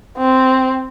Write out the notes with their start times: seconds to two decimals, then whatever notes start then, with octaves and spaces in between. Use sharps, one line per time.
0.18 C4